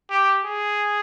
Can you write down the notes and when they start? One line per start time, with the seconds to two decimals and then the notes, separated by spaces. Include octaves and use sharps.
0.10 G4
0.45 G#4